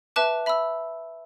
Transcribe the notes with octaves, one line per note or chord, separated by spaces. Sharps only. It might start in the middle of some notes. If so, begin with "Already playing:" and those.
B4 E5 A5 D6 F#6
E5 B5 E6